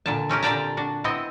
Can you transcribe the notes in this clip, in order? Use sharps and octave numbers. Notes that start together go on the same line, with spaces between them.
A#2 D3 A5
C4 C#4 G4 A#4
A#2 D3 D5 G5 A5 A#5
D4 F#4
B3 C4 E4 D#5